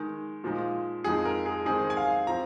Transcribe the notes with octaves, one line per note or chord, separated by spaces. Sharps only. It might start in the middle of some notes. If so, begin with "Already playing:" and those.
Already playing: D#3 G#3 D#4
A#2 F3 G#3 D#4
F2 F3 G#3 D#4 G#4
A#4
G#4
D#3 G#3 C4 D#4 G#4
G#5
F5
F3 C4 A#5